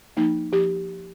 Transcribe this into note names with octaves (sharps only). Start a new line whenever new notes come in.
F3 A#3 D#4
F3 G4